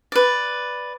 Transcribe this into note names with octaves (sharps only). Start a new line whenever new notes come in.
B4 D5